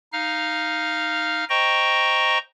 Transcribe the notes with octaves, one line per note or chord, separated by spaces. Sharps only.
D#4 F5 F6
C5 D#5 G5 A#5 C#6